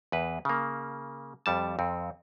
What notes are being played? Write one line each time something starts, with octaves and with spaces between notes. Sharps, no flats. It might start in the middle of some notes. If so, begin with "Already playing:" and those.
E2 B4
C#3 A#3
F2 G3 A5
F2 C4